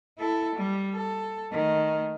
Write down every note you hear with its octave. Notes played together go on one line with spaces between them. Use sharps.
E4 A4
G3
A4
D#3 A3